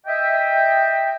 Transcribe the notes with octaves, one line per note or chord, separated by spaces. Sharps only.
D#5 E5 G5